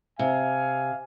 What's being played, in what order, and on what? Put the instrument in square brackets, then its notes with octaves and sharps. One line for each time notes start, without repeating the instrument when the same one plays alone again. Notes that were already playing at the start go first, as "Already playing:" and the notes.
[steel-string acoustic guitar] C3 [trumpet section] F5 G#5